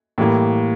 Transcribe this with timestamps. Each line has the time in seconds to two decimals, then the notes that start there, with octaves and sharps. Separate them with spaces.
0.18 A2 E3 G3 A#3